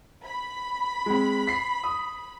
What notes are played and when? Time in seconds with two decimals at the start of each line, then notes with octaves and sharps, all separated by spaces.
0.24 B5
1.06 G#3 C4
1.47 B6 C7
1.84 D#6